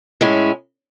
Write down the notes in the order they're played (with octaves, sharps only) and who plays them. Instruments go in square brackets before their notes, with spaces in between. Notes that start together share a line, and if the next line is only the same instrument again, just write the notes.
[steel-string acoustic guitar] A2 G#3 C#4 E4